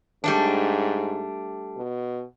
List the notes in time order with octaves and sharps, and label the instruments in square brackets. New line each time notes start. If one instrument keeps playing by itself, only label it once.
[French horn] G#2 [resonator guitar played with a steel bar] G3 A3 D4
[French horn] B2